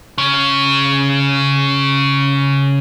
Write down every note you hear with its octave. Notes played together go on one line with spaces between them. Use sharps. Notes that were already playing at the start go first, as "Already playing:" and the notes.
C#3